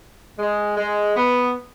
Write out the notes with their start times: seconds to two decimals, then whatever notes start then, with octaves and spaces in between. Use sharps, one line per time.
0.39 G#3
0.77 G#3
1.17 B3